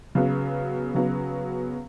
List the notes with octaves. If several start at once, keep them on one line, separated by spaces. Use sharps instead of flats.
C#3 F#3 B3
C#3 F#3 B3